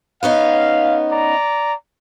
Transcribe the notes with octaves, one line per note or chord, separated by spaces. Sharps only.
B3 C#4 D#4 F5
D5 A#5